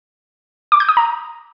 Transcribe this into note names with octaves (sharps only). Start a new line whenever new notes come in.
D6
G6
D#6
A#5